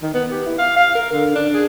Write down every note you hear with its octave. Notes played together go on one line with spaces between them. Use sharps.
D#3
B3
G4
E4
F5
F5
A#4
D3
D4
G#4